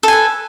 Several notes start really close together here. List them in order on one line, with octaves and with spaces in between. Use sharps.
A4 G#5 B4